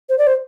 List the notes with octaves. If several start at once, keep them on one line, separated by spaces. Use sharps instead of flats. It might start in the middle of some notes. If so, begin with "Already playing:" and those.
C5
D5
C5